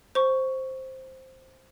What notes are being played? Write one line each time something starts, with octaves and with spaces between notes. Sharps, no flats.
C5 C#6